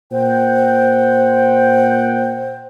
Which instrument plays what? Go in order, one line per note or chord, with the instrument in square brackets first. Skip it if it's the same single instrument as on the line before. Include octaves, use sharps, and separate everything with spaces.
[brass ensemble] A#2 F#5 G5 [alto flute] C5